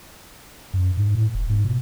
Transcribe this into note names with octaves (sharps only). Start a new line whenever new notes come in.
F#2
G#2
A2
F1
G#2
B2